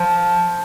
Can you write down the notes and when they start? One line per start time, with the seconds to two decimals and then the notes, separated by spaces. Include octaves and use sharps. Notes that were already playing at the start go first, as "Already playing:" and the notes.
Already playing: F3